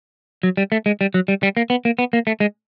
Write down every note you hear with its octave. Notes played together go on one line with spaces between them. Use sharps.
F#3
G3
A3
G#3
G3
F#3
G3
G3
A#3
B3
A#3
B3
A#3
A3
G#3